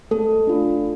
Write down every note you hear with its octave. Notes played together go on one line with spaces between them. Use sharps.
A3 A4
D4 F4